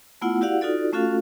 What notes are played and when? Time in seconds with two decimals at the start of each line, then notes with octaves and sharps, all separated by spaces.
0.22 A3 B3 E4 F4 F#5
0.41 E4 F#4 G4 D5 F5 F#5
0.61 D#4 F4 F#4 A4 D5
0.93 A3 C#4 F4 F#4 A4 F5